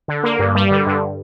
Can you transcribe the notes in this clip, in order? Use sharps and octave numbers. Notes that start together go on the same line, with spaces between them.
D3
A#3
G2
G3
D3
G2